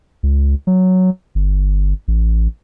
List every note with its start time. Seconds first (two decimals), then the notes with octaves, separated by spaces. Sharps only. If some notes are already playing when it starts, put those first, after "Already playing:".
0.23 C#2
0.67 F#3
1.35 G1
2.08 A1